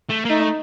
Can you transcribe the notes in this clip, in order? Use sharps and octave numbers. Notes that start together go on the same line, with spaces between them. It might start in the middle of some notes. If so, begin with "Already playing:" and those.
A3
A#3
A3 D#4